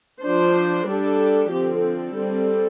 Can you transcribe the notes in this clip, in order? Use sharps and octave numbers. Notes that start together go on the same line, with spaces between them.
F3 D4 C5
G3 D4 A4
D3 F3 C4 G4
A4
G3 C4